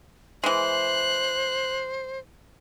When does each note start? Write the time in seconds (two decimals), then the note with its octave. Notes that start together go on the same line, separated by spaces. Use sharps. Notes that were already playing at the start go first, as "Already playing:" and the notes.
0.44 E3 G#3 C5 F#6